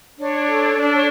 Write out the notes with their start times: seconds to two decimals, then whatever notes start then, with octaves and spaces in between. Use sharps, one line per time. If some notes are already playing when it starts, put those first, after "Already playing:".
0.19 D4 C#5
0.47 A4
0.75 D4
0.93 C#5